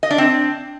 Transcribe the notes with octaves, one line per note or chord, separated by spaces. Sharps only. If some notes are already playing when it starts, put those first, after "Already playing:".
D#5
D4
C4